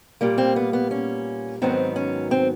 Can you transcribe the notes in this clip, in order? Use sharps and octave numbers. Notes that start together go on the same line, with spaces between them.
A#2 G3 A#3
C4
B3
B3
C#4
G#2 D#3 F#3 B3 C4
C#4
C4